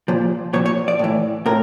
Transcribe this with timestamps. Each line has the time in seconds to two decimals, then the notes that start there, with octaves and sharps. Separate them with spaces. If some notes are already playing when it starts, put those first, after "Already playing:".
0.08 A#2 F3
0.53 A#2 F3 C#5
0.66 C#5
0.88 D5
0.99 A2 E3
1.46 A2 A#4